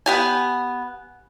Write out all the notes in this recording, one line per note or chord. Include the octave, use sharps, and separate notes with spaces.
B3 G4 G#5